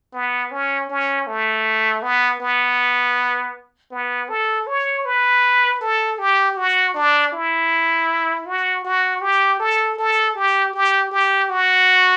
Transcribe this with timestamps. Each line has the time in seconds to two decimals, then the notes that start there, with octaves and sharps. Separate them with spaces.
0.13 B3
0.51 C#4
0.89 C#4
1.27 A3
2.03 B3
2.40 B3
3.91 B3
4.29 A4
4.67 C#5
5.05 B4
5.81 A4
6.19 G4
6.57 F#4
6.94 D4
7.32 E4
8.46 F#4
8.84 F#4
9.21 G4
9.59 A4
9.98 A4
10.35 G4
10.74 G4
11.11 G4
11.50 F#4